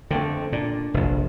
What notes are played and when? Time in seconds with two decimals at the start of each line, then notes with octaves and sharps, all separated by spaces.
0.11 F2 D3 A3 C4
0.52 A#2 D4
0.94 F1 A#1